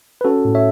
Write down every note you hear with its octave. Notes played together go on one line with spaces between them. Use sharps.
B4
C#4 F#4 A4
A2
C#5 E5